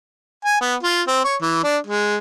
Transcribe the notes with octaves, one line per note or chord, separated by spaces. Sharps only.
G#5
B3
F4
C4
C#5
E3
D4
G#3